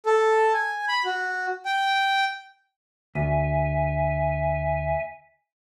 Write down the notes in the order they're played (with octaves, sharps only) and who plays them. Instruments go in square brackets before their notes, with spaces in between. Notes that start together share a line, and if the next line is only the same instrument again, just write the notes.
[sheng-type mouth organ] A4
G#5
B5
F#4
G5
[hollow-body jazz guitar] D2 [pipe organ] E5 G#5